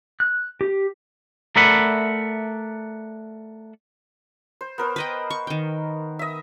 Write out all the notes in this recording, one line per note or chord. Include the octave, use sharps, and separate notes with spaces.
F#6
G4
A3 A#4 D5 E5 F#5 B5
C5
B3 A#4 C5
B4 D#5 G5
C#6
D#3 G5
D#5 E5